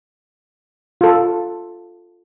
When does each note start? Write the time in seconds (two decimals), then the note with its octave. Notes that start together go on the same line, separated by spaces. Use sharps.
1.01 F4 A4